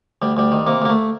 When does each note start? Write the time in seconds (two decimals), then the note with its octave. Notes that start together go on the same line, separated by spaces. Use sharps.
0.22 D2 G3
0.37 D2 G3
0.52 D#3
0.67 C3 A#3
0.82 D2 A#3
0.90 A3